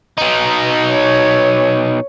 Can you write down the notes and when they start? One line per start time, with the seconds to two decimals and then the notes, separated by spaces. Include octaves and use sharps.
0.18 B2 D#4
0.90 C#5